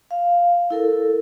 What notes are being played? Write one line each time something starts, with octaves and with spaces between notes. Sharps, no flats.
F5
E4 A4 A#4